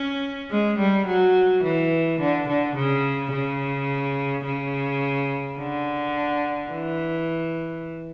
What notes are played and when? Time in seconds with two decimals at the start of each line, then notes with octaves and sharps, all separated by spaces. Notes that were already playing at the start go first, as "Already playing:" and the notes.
Already playing: C#4
0.51 G#3
0.78 G3
1.06 F#3
1.64 E3
2.20 D3
2.48 D3
2.75 C#3
3.32 C#3
4.45 C#3
5.58 D3
6.71 E3